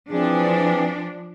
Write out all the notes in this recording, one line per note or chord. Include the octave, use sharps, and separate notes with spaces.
E3 F3 C4 D4 G#4